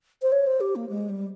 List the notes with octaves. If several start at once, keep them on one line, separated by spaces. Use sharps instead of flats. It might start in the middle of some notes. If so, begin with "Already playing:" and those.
C5
C#5
C5
G4
A#3
G#3
G3